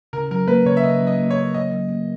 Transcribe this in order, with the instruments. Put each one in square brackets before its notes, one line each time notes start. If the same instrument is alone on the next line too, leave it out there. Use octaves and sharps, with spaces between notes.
[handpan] C#3 [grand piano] A#4
[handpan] F#3 [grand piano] A#4
[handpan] A#3 [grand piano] B4
[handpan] C#3 [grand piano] C#5
[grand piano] E5
[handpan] C#3 [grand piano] D#5
[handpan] F#3
[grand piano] D#5
[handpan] A#3
[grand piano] C#5
[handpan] C#3
[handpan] C#3 [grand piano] D#5
[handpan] F#3
A#3